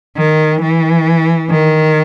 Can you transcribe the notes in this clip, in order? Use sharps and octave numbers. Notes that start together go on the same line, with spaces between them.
D#3
E3
D#3